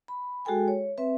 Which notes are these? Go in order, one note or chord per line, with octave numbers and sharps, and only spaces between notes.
B5
G#3 F#4 G#4 A4 G5 G#5
C#5
C4 B4 E5